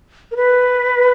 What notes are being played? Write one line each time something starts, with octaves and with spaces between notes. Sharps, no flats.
A#4
B4